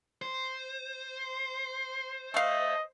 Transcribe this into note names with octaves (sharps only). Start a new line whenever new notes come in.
C5
A3 D#5 F5